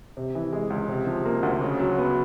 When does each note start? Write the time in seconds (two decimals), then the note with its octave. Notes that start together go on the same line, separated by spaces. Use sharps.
0.17 C3
0.35 E3
0.53 G#3
0.70 C#2
0.89 C3
1.07 F3
1.25 A#3
1.43 D2
1.61 C#3
1.79 F#3
1.98 B3